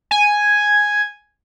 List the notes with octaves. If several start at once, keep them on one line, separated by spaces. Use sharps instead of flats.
G#5